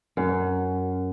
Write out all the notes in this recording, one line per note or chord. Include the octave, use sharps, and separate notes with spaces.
F#2